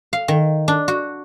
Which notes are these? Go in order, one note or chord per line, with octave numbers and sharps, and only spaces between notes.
F5
D#3
D4
F#4